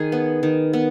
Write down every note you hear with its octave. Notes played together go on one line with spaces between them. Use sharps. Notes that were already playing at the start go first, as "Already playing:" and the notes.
Already playing: D#3 G#4
B3
D#3
B3